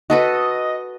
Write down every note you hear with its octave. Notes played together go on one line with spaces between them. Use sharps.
F#4 A4 B4 D#5